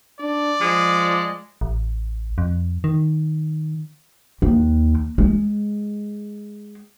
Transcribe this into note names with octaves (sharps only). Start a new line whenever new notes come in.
D4 D5
F3 G#3
A1
F2
D#3
D#2
G#3